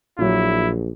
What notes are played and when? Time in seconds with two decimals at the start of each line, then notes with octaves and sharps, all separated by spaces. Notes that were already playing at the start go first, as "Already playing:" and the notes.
0.19 A#1 A#2 F#3 E4